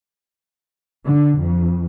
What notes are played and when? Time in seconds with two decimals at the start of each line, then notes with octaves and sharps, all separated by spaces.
1.06 D3
1.39 F2